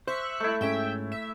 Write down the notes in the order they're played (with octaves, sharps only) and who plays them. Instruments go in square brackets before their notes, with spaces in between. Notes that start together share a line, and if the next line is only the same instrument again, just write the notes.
[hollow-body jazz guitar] C5 [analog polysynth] E5 C#6 F#6
[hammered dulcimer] A3 E4
[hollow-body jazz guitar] G#2 C#4 [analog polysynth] E5 G5
[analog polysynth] E5